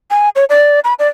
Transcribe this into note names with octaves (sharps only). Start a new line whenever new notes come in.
G#5
C#5
D5
B5
D5